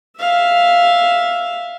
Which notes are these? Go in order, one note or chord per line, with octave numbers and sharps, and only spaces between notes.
E5 F5